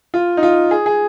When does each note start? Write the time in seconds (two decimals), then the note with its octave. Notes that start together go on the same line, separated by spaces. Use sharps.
0.14 F4
0.37 D#4
0.43 F4
0.71 G#4
0.86 G#4